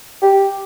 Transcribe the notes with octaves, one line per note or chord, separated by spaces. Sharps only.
G4